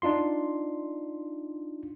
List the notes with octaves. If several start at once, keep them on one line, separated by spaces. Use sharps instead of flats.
D4 D#4 F4 C6